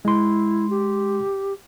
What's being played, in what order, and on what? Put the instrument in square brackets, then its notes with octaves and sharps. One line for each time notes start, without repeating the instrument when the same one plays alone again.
[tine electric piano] G#3 C6 [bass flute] E4
[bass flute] G4